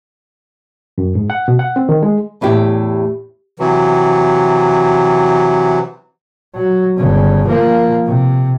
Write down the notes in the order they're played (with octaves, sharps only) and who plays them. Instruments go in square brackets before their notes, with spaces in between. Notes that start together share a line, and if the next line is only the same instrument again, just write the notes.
[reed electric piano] F#2
G#2
F#5
B2
F#5
C4
D#3
G#3
[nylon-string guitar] E2 A2 E4 G4
[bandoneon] C3 E3 F#3
[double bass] F#3
G1 C#3
F3 A#3
C3